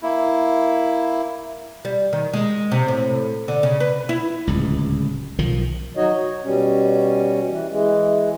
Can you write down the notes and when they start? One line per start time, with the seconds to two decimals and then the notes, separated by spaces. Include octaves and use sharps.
0.03 A#3 E4
1.85 G3
2.13 D#3
2.33 G#3
2.72 C3
2.88 A2
3.48 D3
3.63 C#3
3.80 B4
4.09 E4
4.47 D1 C#2
5.39 B1 D#3 F3
5.97 F#3 D#4 F#4 C#5 D#5
6.14 C#5
6.44 B2 G3 C#4
7.50 E3
7.71 E3 G#3